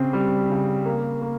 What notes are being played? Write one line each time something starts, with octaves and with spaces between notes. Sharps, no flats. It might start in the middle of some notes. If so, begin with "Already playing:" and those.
Already playing: C#3 C4
G3
C#3
A#3
A#3